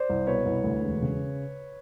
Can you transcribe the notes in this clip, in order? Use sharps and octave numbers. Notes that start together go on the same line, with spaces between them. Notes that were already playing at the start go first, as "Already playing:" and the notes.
Already playing: C5 D5
C2
B2 B4 C#5
C2
D2
E1
C#3